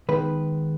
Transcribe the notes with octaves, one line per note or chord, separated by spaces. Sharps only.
D#3 G#3 B3 B4